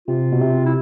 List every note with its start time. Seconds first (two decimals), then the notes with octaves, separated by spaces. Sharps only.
0.08 C3 F4
0.32 B2
0.41 C3
0.66 E4